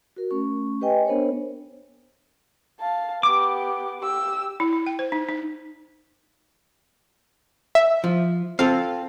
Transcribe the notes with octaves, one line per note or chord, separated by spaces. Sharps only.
F#4 A#4
A3 C#4 C#6
G4 B4 D#5 G5 G#5
B3 D4 A#4 C5 C#5
F5 A5
B3 G4 D6
G4 E6
E4
E4
G5
C5
D#4
D#4
E5
F3
C4 F4 A4 F5